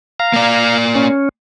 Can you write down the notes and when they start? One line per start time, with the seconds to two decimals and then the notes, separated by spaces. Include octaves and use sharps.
0.20 F5 A#5
0.33 A#3 D5
0.95 C#4